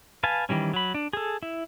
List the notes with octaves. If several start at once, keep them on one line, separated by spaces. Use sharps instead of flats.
B4 F5 G#5 A5
D#3 E3 G3 C#4
F#3 B5
D4
G#4 A4
E4